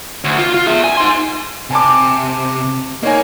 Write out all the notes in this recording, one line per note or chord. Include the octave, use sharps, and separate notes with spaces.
D2
F4
F4
G#4 E5
G#5
D#4 C6
C3 G#5 A5 D6
A#3 D#4 C#5 G#5